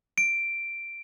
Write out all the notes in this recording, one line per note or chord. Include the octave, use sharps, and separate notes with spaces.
D7